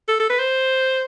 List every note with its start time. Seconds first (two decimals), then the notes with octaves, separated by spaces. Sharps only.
0.08 A4
0.20 A4
0.30 B4
0.40 C5